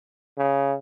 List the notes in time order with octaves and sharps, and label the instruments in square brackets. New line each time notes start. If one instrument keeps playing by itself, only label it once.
[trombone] C#3